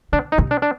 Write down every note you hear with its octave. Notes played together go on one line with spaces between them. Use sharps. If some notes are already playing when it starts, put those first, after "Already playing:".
D3 D4
D#4
C3
D4
D4